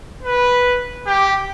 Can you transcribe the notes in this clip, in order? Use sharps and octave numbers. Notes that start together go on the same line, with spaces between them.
B4
G4